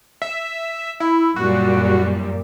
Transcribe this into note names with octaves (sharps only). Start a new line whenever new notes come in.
E5
E4
F#2 A#2 G3 F#4